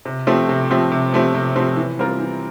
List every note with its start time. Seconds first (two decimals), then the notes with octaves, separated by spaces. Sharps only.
0.05 C3
0.27 F3 A3 C4 G4
0.49 C3
0.71 F3 A3 C4 G4
0.91 C3
1.13 F3 A3 C4 G4
1.34 C3
1.56 F3 A3 C4 G4
1.76 E3
1.99 G3 C4 F4 A#4
2.20 E3